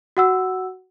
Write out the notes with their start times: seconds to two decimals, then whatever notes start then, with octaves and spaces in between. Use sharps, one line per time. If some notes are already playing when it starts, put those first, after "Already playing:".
0.17 F#4 F#5 E6